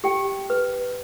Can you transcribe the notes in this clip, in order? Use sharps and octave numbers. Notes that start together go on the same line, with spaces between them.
G4 G5
B4